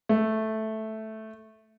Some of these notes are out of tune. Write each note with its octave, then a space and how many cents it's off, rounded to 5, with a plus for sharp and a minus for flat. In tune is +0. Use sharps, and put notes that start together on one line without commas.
A3 -5